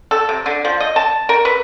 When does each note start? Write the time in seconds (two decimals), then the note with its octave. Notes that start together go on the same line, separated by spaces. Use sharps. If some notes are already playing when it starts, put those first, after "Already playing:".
0.11 A4
0.29 C3
0.46 D3
0.65 F3
0.80 D#5
0.96 A5
1.29 A#4
1.45 B4